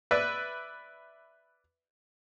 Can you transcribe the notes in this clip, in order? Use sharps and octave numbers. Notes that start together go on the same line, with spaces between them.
B4 D5 E5